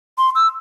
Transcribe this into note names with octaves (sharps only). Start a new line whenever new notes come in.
C6
E6